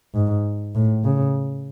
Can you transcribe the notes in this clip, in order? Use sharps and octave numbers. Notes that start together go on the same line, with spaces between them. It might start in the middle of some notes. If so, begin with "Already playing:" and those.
G#2
A2
C#3